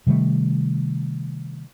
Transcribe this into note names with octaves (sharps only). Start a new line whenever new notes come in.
C3 D#3 G3 A3